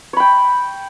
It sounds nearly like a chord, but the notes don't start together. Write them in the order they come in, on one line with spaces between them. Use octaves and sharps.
C#5 B5 G5